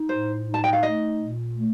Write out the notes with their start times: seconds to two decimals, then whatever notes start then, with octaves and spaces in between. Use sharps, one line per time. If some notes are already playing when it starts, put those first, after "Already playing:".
Already playing: D#4
0.09 A2 C5
0.46 D#4
0.54 A5
0.64 G5
0.73 F5
0.83 A3 D#5
1.20 A#2
1.57 A3